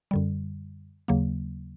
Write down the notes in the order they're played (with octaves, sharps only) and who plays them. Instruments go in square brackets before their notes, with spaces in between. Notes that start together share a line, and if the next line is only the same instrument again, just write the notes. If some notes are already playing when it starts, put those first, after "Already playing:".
[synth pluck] F#2 D3 G3
D#2 C#3 F#3 A#3